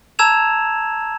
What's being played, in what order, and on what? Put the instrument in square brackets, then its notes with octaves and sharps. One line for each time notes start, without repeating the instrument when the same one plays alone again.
[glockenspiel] A5 A#5 E6 G#6 E7 F7